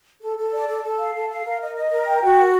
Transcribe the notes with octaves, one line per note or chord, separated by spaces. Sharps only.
A4
A4
D5
A4
A4
F5
A4
F5
A#4
D#5
D#5
A#4
G5
F#4
A#4